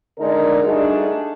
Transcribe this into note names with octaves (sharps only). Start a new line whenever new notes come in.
D3 G#3 D4 D#4 A#4 D5
G3 A3 D4 D#4 F#4 G#4